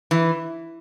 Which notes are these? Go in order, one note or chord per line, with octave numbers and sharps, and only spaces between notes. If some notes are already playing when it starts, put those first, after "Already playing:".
E3